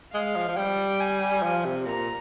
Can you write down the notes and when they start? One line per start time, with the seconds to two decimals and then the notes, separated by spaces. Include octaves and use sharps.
0.14 G#3 F5
0.36 F3
0.48 F3
0.57 G3 G5
1.00 G#5
1.43 F3
1.65 C3
1.86 A#2 A#5